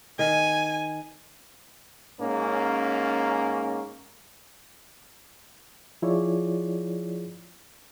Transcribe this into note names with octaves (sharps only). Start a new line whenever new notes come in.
D#3 G#5
G#2 A#3 C#4
F3 E4 F4 G#4 C#5 D5